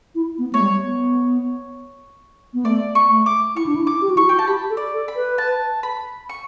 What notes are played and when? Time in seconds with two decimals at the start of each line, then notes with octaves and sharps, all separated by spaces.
0.15 E4
0.38 B3
0.53 A3 C#5
0.60 G3
0.83 B3
2.54 B3
2.65 A3 D5
2.95 C#6
3.10 A3
3.26 D6
3.56 E4 C#6
3.66 D4
3.75 E4
3.87 D6
4.02 G4
4.09 F#4
4.17 E4 C#6
4.24 F#4
4.29 G5
4.39 A5
4.47 G4 B5
4.70 A4
4.77 D5
4.93 A4
5.08 B5
5.16 B4
5.38 A5
5.83 B5
6.29 C#6